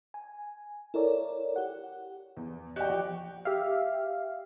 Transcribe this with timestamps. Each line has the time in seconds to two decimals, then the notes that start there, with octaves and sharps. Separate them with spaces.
0.14 G#5
0.94 E4 A4 A#4 C#5 D5
1.56 G4 F#5
2.37 E2
2.76 F#4 G4 D5 D#5 G5
2.90 F3
3.45 G4 E5 F5